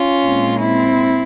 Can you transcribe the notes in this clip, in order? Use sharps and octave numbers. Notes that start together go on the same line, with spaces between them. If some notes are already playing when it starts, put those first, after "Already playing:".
Already playing: C#4 F4
A#2 G#3 C4
C4 E4